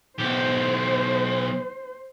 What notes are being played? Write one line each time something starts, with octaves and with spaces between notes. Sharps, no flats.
B1 G4 C5